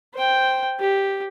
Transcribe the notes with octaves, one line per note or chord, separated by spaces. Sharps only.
C5 G5
G4